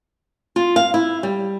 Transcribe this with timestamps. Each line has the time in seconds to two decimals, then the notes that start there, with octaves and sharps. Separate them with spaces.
0.56 F4
0.76 F5
0.94 E4
1.23 G3